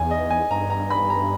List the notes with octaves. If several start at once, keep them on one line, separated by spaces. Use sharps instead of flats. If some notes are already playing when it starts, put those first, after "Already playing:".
Already playing: E2 G#5
D#5
G#5
G2 A#5
A#5
B5
A#5